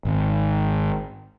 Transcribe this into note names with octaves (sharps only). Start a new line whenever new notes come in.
G#1